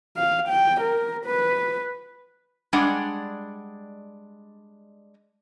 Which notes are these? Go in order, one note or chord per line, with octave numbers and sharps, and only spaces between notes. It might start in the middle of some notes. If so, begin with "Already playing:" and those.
F5
G5
A#4
B4
G3 G#3 D4 D5 F#5